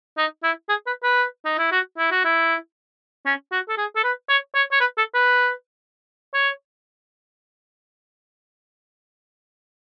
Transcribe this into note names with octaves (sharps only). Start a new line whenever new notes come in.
D#4
E4
G#4
B4
B4
D#4
E4
F#4
E4
F#4
E4
C#4
F#4
A4
G#4
A4
B4
C#5
C#5
C#5
B4
A4
B4
C#5